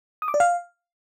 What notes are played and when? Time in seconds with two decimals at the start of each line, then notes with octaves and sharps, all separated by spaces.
0.22 D#6
0.28 D6
0.34 D5
0.40 F5